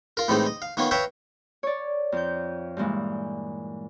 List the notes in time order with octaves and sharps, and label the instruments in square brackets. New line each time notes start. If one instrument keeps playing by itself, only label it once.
[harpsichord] F4 A#4
A2 E3 G3 G#3 C4 D#4
D#5
F5
D#3 A#3 B3 C#4 F4
B4 C#5 E5 F5 G5 A#5
[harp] C#5 D5
F2 F3 G6
G2 A#2 E3 G#3